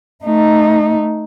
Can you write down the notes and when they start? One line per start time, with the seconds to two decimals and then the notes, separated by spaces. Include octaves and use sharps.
0.24 A3 D#4